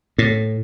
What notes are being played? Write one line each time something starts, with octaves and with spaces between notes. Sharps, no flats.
A2